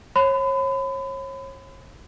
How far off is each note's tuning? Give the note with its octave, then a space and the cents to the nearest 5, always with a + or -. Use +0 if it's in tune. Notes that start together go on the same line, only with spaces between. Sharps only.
C#5 -35 B5 +35